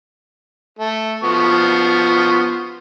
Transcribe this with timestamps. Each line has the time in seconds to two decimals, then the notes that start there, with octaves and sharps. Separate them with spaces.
0.79 A3
1.24 F3 B3 C#6